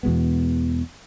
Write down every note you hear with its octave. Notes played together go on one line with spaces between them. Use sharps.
E2 B2 G#3 B3